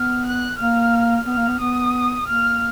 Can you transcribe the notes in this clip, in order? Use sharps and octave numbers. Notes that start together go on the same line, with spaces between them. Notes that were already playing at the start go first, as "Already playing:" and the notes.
Already playing: B3 F6
F#6
A#3 F6
B3 F6
A#3
B3
B3 D#6
A#3 F6